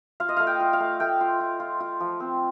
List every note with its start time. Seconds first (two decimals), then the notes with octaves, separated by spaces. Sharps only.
0.20 F4 F5
0.29 D#5
0.37 A3 F5
0.47 G5
0.60 F4
0.73 F5
0.80 A3
1.00 A3 G5
1.21 F4
1.40 F4
1.60 F4
1.80 F4
2.00 F3
2.20 C4